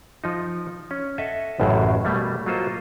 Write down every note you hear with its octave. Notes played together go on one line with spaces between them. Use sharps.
F3 D#4
C#4
A4 D#5 E5 F#5 A5
A1 F#2 A2 C#3 F#3 C5
B2 G3 A3 A#3
F#3 A#3 F4 A4 C5 D#5